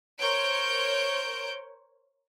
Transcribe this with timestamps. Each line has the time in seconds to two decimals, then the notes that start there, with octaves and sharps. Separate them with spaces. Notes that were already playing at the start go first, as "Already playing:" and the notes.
0.19 A#4 C5 C#5 G6 D7